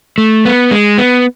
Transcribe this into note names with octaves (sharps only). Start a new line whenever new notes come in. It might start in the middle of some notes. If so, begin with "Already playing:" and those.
A3
B3
G#3
B3